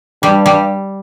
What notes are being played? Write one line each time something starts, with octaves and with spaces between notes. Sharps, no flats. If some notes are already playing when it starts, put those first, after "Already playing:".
G2 G3
G3